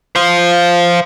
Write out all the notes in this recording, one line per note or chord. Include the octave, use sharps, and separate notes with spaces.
C5 F5